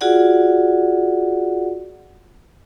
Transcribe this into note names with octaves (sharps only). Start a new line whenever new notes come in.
F4 F#4 G#4 D5 F#5